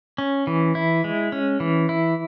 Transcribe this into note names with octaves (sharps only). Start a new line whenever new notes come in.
C#4
E3
E4
G#3
C#4
E3
E4